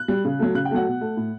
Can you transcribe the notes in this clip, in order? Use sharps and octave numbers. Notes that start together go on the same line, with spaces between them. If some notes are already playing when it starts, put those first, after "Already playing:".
Already playing: F#6
G3
C#3
F#3 A3
C#3 F#6
G5
F#3 A3 F#5
B2
A3
A2